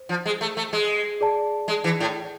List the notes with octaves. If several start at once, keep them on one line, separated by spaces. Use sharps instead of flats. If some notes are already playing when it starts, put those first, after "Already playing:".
Already playing: C5
F3
G#3
A3
A3
G#3
G#4 D5 A5
G#3
E3
A2